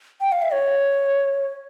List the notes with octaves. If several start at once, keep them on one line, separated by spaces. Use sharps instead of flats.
G5
F5
E5
C#5